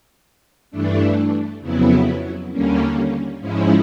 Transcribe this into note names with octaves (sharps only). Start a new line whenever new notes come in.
G2 E3 A3 D4
F2 C#3 F#3 B3 E4
D#2 D3 G3 A#3 C#4
G#2 F3 G#3 C#4 E4